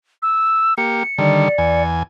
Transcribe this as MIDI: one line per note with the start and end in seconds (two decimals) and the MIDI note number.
0.22 0.74 88
0.78 1.03 58
0.78 1.03 67
0.78 1.83 97
1.18 1.49 50
1.18 1.49 51
1.18 1.49 55
1.18 1.82 74
1.58 2.03 40
1.58 2.03 80